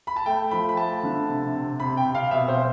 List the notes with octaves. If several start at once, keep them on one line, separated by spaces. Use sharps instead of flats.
B5
A5
A3 G5
F3 B5
B5
A3 A5
D3
C3
C3
C3 B5
G5
C3
F5
B2 E5
C5
B2